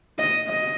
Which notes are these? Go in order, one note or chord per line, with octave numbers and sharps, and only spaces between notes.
D#5
D#5